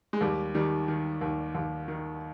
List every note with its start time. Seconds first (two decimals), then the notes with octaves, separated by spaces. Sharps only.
0.13 G#3
0.21 D#2 G3
0.55 D#3 G3
0.88 D#3
1.21 D#2
1.55 D#2
1.88 D#3